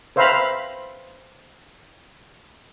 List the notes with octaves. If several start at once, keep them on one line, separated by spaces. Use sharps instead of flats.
B4 C5 E5 F5 A#5 B5